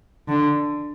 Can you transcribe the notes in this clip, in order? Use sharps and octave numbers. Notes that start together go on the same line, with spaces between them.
D3